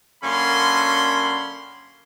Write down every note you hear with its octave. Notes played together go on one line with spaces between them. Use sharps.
F#2 D3 A#3 C#4 B5 C6